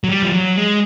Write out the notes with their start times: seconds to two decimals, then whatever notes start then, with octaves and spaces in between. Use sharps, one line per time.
0.04 F#3
0.09 G3
0.22 F3
0.33 F#3
0.57 G#3